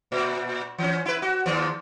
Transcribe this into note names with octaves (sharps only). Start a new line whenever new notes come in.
A#2
E3 C#4
E4 B4
F#4
D#2 F3